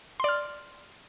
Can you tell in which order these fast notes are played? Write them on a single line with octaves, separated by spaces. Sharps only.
C6 D5 F6